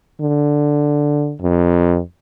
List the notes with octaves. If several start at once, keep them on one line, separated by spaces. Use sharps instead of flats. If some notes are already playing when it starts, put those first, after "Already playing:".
D3
F2